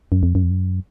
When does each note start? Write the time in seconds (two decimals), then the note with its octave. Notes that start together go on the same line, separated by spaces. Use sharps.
0.12 F#2
0.23 F2
0.35 F#2
0.43 F2
0.50 F#2